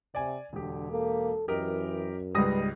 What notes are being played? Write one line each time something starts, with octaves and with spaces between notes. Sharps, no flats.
C3 D5 G#5
E1 D3 G4
A#3 A4
F#2 E3 G4 A#4 D#5
C#2 G#2 G3 B4 D#6 A#6